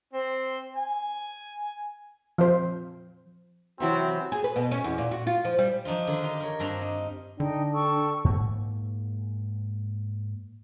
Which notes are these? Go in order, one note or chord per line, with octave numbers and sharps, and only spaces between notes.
C4
G#5
F3 C5
C3 E3 F#3 C4 F#4
G#4
B4
B2
C#4
E2
A#2
F#4
F4
F3
G3
F3 D4 D#4 F4
D3 D#3 A#3
D#4 F4 G4
A#4 C#5
G2 C4 D4 F4 A#5
D#4
D3 D4 D#4 G5
A4 G5 C#6
G#2 A#3